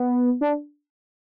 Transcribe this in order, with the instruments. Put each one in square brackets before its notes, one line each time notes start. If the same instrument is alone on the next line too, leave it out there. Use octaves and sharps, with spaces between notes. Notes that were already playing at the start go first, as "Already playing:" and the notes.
Already playing: [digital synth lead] B3
D4